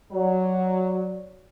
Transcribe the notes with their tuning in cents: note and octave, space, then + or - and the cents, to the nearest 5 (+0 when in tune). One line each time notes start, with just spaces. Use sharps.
F#3 +0 D5 -5